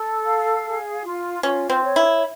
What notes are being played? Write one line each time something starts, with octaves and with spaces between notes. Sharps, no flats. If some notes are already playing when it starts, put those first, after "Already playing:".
Already playing: A4
F5
G#4
F4
C#4 F4
C4
C#5
E4